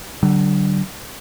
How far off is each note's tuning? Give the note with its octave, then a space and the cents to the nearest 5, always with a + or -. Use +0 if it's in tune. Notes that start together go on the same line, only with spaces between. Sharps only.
D3 +0 F#3 +45